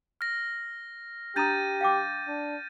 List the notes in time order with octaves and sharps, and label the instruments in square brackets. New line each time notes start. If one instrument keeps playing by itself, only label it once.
[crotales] F6 A#6
[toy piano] D4 A#5 D#6 [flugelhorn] G4 [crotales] G6 A6 D#7
[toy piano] F5 G5 D6
[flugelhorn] D4